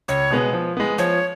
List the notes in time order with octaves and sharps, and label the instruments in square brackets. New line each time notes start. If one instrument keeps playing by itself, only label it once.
[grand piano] C#2 [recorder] C#5
[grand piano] B2 G#3 B3
F3
G#3 B3
[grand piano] F3 [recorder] C#5